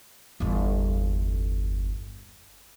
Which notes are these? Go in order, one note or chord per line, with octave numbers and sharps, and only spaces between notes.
G1 E2